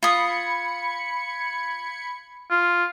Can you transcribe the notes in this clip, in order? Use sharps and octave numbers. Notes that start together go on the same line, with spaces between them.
F4 B5 D#6 G#6 C#7
F4